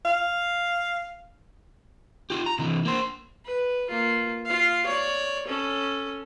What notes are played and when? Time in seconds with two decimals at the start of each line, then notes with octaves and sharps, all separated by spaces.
0.05 F5
2.30 F4 G4
2.46 A#5
2.59 C3 E3
2.85 A#3 C5
3.45 B4
3.90 A#3 F4
4.45 F4 F5
4.86 C#5 D5
5.48 C#4 A4